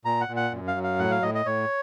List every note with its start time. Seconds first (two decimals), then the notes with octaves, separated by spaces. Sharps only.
0.05 A#2 A#5
0.21 F#5
0.28 A#2
0.36 F#5
0.52 F#2
0.67 F5
0.76 F#3
0.83 F5
0.99 A2 F#5
1.11 F5
1.22 A2 D#5
1.35 D#5
1.46 A2 C#5